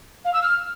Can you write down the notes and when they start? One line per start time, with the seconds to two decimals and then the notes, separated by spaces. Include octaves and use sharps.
0.24 F5
0.33 E6
0.41 F6